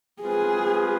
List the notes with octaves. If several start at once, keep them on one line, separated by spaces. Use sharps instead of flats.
G#3 C4 F4 G#4 B4